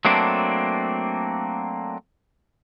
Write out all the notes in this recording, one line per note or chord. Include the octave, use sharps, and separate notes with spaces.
F#3 A3 A#3 C4 D4